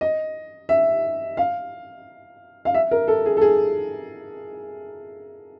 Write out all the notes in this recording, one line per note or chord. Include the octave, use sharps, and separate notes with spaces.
D#5
E5
F5
F5
E5
A#4
A4
G#4
A4
G#4